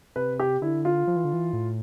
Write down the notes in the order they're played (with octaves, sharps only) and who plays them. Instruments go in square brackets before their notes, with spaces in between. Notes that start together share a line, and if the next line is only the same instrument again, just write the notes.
[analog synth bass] C3 [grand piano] B4
[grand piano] G4
[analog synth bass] D3 [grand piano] E4
[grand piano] F4
[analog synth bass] F3
E3
D3
E3
A2